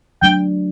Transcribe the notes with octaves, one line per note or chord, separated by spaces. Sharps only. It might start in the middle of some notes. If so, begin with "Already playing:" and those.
F#3 A3 D4 G5